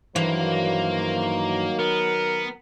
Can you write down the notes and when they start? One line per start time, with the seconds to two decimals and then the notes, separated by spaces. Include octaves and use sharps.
0.16 G2 D#3 E3 F#3 A#3 C5
1.79 B3 A#4